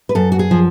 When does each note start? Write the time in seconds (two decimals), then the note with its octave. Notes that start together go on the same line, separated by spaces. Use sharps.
0.09 B4
0.15 F#2 A4
0.32 F#4
0.39 G#4
0.51 F3